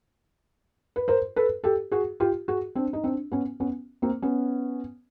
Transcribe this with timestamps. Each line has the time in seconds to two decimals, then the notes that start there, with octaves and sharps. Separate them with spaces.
0.96 B4
1.08 A#4 C5
1.36 A4 B4
1.64 G4 A4
1.92 F#4 G#4
2.20 F4 G4
2.48 F#4 G#4
2.75 C4 D4
2.93 D#4
3.04 C4 D4
3.32 B3 C#4
3.60 B3 C#4
4.02 A#3 C4
4.22 B3 C#4